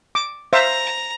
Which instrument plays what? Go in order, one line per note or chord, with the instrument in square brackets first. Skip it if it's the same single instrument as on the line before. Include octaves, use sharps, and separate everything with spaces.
[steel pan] D6
[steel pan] C5 E5 F5 [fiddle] A#5